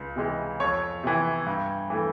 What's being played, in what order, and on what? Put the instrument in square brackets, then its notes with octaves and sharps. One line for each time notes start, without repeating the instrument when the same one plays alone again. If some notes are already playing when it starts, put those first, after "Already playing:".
Already playing: [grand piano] C#2
C3 E3 G#3
F2 C#5
C3 E3
G2
E3 A3